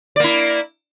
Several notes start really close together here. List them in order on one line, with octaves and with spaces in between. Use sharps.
D5 A#3 E4